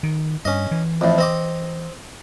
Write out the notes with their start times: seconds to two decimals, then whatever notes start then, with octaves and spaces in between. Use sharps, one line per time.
0.03 D#3
0.45 G2 C#4 D#5
0.71 E3
1.01 F2 A2
1.18 C4 D#5 D6